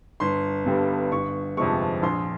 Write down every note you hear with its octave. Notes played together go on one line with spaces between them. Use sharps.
G1 C6
G2 D3 G3 B3
G1 C#6
F2 C3 F3 G#3 C#6
A#1 C6